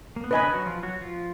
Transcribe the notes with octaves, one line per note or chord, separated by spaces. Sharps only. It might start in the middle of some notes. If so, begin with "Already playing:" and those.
A#3
B3
D3 D4 B4 D#5 G#5 B5
D3 D4
F#3 F#4
F3 F4
F#3 F#4
F3 F4